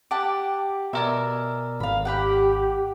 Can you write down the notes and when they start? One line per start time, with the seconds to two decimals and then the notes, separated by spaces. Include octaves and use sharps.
0.11 G4 F#5 A5 D6
0.93 B2 A#4 D5 E5 G#5
1.80 G#1 F5 B5
2.05 G4 F#5 G5 B5